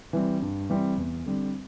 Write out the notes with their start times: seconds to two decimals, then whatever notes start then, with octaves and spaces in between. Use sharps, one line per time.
0.13 E3 G3 C4
0.42 G2
0.70 E3 G3 C4
0.98 E2
1.26 D3 G3 C4